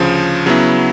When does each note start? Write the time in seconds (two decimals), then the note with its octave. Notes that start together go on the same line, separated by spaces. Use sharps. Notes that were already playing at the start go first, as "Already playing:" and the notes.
Already playing: D2 C#3 F3
0.46 C#3 F#3 B3 E4